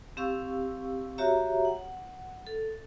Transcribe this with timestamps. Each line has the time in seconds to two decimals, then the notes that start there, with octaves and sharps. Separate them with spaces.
0.17 C4 G4 F5 C#6 E6
1.18 F#4 G4 C#5 E5 A#5
1.65 F#5
2.47 A4